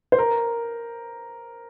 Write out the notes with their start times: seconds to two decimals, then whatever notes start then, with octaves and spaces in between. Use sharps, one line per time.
0.12 C5
0.19 A#4